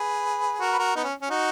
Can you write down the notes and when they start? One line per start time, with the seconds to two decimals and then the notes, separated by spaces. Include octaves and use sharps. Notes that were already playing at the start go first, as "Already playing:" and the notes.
Already playing: G#4 B4
0.60 F#4 A#4
0.73 B4
0.78 F#4 A#4
0.96 B3 D#4
1.04 C#4
1.22 C#4
1.30 D#4 F#4